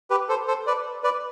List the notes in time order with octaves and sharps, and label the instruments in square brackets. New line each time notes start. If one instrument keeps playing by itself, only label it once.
[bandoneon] G4 B4
A4 C5
A4 C5
B4 D5
B4 D5